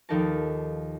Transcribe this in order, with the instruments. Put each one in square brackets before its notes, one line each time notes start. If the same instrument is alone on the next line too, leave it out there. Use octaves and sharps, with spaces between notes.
[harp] D#2 F3 D#4 A4 A#4 A5